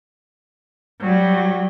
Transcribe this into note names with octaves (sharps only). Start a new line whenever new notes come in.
F#3 G3